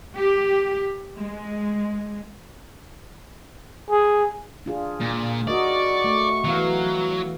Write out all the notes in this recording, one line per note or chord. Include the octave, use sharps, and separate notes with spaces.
G4
G#3
G#4
D4 F4 G#4
A#2
F#4 A#4 D5 D#5 C#6
A3
E3 F#3 B3 F5